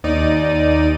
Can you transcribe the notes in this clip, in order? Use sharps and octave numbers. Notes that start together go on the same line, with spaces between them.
D#2 D#4 D5 D#7